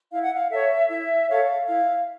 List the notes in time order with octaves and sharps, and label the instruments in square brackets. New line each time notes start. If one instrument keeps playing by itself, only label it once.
[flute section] E4 F5
F#5
F5
A4 C#5 E5
E4 E5
A4 C#5 F5
E4 F5